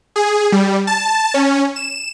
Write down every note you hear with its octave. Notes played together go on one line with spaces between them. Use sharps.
G#4
G3
A5
C#4
E7